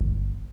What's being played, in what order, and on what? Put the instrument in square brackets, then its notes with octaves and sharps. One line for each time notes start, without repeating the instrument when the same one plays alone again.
[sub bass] G1